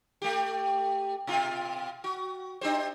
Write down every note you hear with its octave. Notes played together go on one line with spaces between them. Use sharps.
A3 G4
B2 F4
F#4
D4 G4 C5